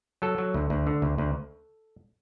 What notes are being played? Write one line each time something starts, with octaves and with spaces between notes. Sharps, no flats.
F#3 A4
F#3
D2
D2
D3
D2
D2